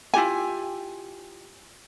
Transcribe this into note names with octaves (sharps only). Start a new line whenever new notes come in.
E4 F4 G4 G#5